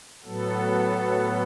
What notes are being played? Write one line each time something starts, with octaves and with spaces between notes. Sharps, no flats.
A2 F#3 B3 A4